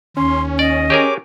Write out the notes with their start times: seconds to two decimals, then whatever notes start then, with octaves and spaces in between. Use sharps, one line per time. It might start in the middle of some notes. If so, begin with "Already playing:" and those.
0.17 D#2 C#4 C6
0.59 D5 D#5
0.90 G4 G#4 A#4 C#5 D6